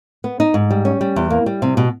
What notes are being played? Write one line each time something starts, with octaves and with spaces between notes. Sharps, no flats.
B3
D#4
G#2
G3
C#4
G3
E2
A#3
G3
C3
B2